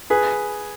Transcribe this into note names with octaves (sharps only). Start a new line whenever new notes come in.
G#4 B4